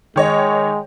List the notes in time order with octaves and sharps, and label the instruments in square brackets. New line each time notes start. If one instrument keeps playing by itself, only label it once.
[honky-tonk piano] D#3 C#5 D#5 [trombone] G#3